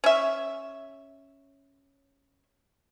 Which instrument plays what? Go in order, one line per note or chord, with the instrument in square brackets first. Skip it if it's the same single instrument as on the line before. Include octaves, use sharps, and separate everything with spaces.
[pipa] C#4 E5